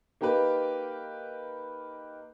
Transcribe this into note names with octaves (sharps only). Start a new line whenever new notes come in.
A#3 D#4 G4 A#4 B4